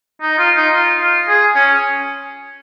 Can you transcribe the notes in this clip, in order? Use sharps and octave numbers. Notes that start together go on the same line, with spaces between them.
D#4
F4
D#4
F4
F4
G#4
C#4